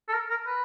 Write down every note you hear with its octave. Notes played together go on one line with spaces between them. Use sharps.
A4
A#4
A#4
B4